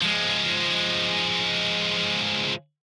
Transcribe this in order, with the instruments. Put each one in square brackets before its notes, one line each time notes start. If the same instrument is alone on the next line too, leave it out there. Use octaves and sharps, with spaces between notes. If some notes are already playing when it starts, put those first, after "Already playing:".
[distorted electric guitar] F3 G#3